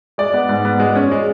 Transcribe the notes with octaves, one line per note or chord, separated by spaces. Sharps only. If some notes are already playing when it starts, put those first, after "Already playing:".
G#3 D5
B3
G#2
B3
G#3
C#4
G#3